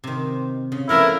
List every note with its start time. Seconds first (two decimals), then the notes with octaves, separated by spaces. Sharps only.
0.04 C3 D#3
0.72 C#3
0.89 C#3 F3 A3 B3 E4 A4 A#4